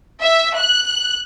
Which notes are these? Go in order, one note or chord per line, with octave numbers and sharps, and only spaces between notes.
E5
F#6